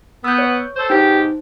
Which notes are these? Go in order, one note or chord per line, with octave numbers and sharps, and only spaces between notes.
B3 E6 G6
C#5
A4 C5
G#2 B2 D#4 G4 C5